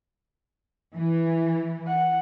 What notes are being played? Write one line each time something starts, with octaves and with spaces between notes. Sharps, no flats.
E3
F#5